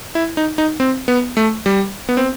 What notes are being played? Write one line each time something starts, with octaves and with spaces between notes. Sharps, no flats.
E4
D#4
D#4
C4
B3
A3
G3
B3
C4